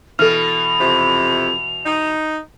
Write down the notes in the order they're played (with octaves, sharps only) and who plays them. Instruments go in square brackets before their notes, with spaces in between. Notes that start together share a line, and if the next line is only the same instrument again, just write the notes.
[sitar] B2 E3 [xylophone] A4 F6 [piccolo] F7
[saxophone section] F2 C3
D#4